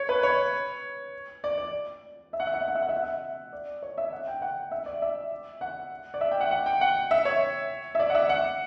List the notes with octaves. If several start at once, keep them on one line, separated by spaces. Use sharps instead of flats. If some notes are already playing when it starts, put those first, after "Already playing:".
Already playing: C#5
B4
C#5
D5
D5
E5
F#5
E5
F#5
E5
F#5
E5
F#5
E5
F#5
E5
D5
C#5
E5
F#5
G5
F#5
E5
D5
E5
F#5
D5
E5
G5
F#5
F#5
G5
F#5
E5
C#5
E5
D5
F#5
E5
F#5